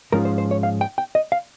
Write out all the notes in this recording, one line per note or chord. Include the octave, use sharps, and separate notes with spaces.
G#2 F3 G#3 C#4 F4 A#4
C5
C5
C#5
F5
G5
G5
D#5
F5